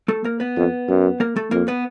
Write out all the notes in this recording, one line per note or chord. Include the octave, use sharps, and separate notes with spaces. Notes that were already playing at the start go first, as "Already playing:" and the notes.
A3 A4
A#3 A#4
B3 B4
F2
F#2
A#3 A#4
A3 A4
F2 A#3 A#4
B3 B4